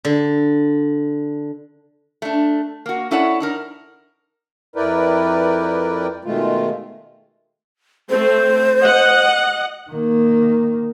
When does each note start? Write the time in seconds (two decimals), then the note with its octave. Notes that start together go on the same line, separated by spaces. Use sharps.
0.05 D3
2.22 A3 D4
2.86 A#3 F#4
3.11 C#4 E4 A4 C#5 D5 F#5
3.40 D4 D#4 A#4
4.76 F2 E4 A#4 B4 D5 G5
6.25 B2 D#3 G#3 A3 F4
8.10 A3 C4 C5
8.82 D#5 F#5
9.90 D#3 A#3